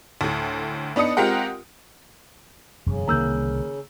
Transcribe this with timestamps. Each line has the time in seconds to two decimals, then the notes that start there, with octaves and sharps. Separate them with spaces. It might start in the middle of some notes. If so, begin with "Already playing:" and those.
0.21 D2 A2
0.96 B3 D4 D#4 D#6 C#7
1.17 G#3 C4 F4 G4 A#4 F#5
2.86 E1 F#2 C#3
3.08 C2 D3 D#3 A#3 A#5 E6 G6